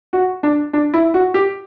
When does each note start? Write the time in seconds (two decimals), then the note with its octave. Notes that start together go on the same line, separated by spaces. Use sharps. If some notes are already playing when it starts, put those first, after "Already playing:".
0.13 F#4
0.43 D4
0.73 D4
0.94 E4
1.14 F#4
1.34 G4